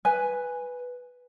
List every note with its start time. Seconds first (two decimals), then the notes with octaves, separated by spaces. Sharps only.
0.05 B4 G#5